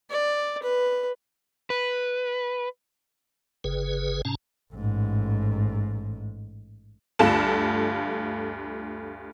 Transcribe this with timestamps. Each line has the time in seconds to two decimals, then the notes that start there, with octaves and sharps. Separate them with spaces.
0.10 D5
0.63 B4
1.70 B4
3.64 G1 C#3 G#4 B4
4.25 G#2 C3 C#4 A5 A#5
4.74 A1 G#2
7.19 D2 G2 F4 A4 E7